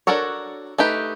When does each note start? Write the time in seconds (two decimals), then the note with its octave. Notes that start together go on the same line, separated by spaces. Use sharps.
0.07 D4 F#4 A4 A#4 C#5
0.78 A3 D#4 G4 B4